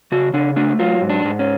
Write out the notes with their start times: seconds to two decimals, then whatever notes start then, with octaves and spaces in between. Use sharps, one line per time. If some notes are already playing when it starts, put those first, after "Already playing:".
0.12 C#3 F#4
0.34 C#3 D4
0.56 A3 D4
0.79 F#3 F4
1.02 G#2
1.09 D4
1.24 G#2
1.39 C#4